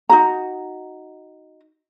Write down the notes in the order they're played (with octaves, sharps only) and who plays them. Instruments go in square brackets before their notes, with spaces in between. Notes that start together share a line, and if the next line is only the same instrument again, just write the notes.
[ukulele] D#4 F#4 A#5